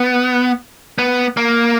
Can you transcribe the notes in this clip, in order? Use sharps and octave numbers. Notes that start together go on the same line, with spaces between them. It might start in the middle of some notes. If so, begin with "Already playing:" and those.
Already playing: B3
B3
A#3